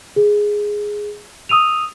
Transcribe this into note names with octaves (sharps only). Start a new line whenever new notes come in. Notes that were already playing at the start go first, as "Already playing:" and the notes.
G#4
D#6 E6 D#7 F7